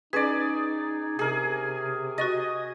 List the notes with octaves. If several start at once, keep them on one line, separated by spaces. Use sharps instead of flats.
C#4 D#4 G#4 B4 D5
C3 G#4 A#4
F#4 D#5 C#6 A6